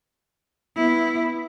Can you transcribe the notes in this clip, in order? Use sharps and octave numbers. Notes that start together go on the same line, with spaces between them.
B3 E4